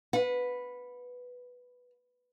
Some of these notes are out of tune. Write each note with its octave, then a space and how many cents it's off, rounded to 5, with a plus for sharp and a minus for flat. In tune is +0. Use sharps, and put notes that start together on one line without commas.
B4 +0 F#5 -35